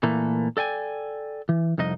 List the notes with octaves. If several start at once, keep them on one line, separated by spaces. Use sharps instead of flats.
A#2 E3 A3 A#3
A4 D5 G5 G#5
E3
C2 F2 D#4 D#5